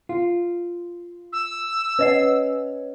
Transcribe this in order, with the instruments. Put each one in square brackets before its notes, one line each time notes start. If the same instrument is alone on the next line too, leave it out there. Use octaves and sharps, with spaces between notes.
[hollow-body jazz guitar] F4
[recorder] E6
[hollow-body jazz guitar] C#4 [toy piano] B4 D#5 F#5